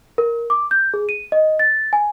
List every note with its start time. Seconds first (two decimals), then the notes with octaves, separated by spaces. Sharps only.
0.18 A#4
0.50 D6
0.71 G6
0.94 G#4
1.09 D#7
1.32 D#5
1.59 A6
1.93 G#5